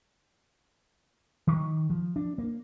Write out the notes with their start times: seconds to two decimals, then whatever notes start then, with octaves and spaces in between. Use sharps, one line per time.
1.47 D#3
1.90 F3
2.16 D4
2.38 A#3